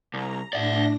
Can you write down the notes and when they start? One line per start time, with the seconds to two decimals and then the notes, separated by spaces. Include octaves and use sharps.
0.14 C2 A#5
0.53 A2 D4 D5 E5 A#6